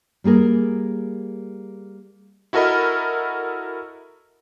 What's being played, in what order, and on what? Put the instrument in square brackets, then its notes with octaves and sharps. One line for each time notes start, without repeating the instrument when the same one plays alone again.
[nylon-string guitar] G3 A#3 G#4 A#4
[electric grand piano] E4 F#4 A4 A#4 D#5 B5